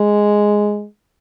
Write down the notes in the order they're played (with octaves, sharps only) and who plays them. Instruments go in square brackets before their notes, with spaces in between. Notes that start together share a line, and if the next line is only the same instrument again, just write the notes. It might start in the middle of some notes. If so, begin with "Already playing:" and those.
Already playing: [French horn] G#3